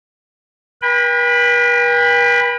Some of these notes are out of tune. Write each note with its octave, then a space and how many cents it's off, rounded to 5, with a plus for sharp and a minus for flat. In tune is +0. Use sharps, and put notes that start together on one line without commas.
B4 -45 G5 +40 B5 +0